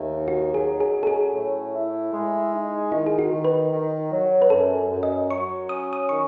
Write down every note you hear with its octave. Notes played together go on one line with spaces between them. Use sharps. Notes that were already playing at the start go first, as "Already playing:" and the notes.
Already playing: D#2 A3
D#4
F#4
F#3 G#4
G#4
C#4
A4
G#4
A2
E4
G#3
D#4
D#3 E4
G#4
F#4
D#3
B4
D#3
F#3
B4
F#2 A4
F#2
D#5
F#3 C#6
C#4 D#6
D#6
D#3 C#6